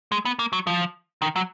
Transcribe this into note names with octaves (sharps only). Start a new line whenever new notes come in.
G#3
B3
A#3
F#3
F3
D#3
F#3